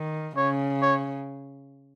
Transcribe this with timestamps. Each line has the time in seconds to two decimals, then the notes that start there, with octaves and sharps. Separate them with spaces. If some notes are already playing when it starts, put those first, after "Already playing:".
Already playing: D#3
0.36 C#3 C#5
0.82 C#5